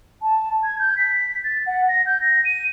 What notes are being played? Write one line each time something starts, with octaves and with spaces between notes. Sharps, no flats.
A5
G#6
G6
B6
A6
F#5
A#6
G6
A#6
D#7